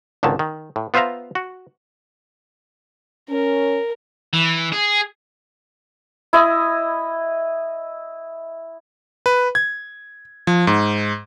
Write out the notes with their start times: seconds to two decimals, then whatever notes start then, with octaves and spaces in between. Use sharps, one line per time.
0.23 G#1 C#2 D3 D#3 A5
0.39 D#3
0.76 A2
0.94 B3 F4 C5 E5 F5 A#5
1.35 F#4
3.30 C#4 A#4
4.33 E3
4.72 G#4
6.33 E4 D#5
9.26 B4
9.55 G#6
10.47 F3
10.67 G#2